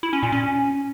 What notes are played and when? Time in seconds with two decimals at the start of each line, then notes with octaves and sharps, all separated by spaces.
0.03 E4
0.13 C#4
0.23 A#2
0.32 C#4